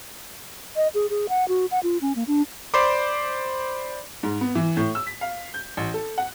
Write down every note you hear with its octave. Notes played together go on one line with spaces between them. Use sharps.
D#5
G#4
G#4
F#5
F#4
F#5
F4
C#4
A#3
D4
C5 D5 B5 C6 D6
G#2
B3
E3
A2
E6
B6
F5
G6
A1
A4
F#5